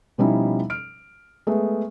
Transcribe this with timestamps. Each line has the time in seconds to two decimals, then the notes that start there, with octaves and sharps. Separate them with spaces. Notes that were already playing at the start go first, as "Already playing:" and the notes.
0.18 B2 F3 G3 C#4 D#4 E4
0.70 F6 D7
1.47 G#3 A3 B3